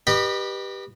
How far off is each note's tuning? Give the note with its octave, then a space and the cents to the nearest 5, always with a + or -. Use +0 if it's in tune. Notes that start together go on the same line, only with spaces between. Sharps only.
G4 +0 B4 -20 D#5 -35